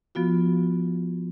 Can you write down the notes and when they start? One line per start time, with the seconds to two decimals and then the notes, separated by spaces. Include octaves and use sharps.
0.15 F3 B3 F4 F#4